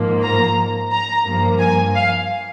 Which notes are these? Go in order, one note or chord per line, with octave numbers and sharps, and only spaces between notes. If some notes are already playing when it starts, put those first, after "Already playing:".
Already playing: G#2 F3 A#3
A#5
A#5
G2 F3 A#3
G#5
F5